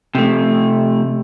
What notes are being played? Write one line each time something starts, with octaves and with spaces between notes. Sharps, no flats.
C3 A3